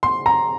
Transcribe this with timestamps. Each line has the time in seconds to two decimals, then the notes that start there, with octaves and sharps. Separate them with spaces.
0.03 C6
0.26 A#5